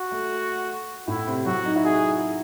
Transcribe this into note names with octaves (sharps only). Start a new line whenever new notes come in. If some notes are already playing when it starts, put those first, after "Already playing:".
Already playing: F#4
A3
A2 E4
C3
F#3 F#4
D#4
E4
F#4 G#4